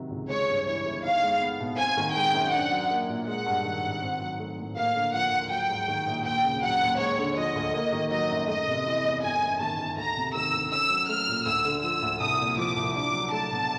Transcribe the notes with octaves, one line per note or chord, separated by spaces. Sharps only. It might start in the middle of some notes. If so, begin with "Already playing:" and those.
Already playing: C3 D#3 F#3
C#2
G#3 C#5
G2
E3 C#5
G1
D#4 F5
G#3
B3
B2
C4 G#5
D#3
G#3 G5
F#2
D4 F#5
F#3
A#3
A#2
G#3 F#5
G2
D#3
G#1
C4
F#3
A3
A2
A#3 F5
D3
F3 F#5
D#2
F#3 G5
G#2
D#3
A#1
D#2 G5
C#3
F#3 F#5
D#2
G#3 C#5
D3
F3 D#5
D2
A#3
D#3
F#3 D#5
F#2
A3 D#5
C3
E3
E2
G1 G#5
F#2
D#3 A5
G1
D2 A#5
C3
D#3 E6
D2
C#4 E6
F#3
A3 F6
A#2
D2 E6
D3
F3 E6
D2
C2 D#6
A#2
F3 D6
C2
D4 D6
F#3
A3 A5
B2